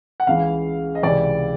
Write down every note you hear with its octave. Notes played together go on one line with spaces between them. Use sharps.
F#5
C#2 C#3 E3 F5
D#5
C#2 C3 E3 D5